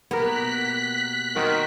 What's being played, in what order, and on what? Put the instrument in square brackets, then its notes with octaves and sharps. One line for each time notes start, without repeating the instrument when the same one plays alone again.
[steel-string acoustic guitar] B2 A#3 G4 [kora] B3 A#4 [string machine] F#6 B6
[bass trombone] D#3 [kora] C4 F#4 A#4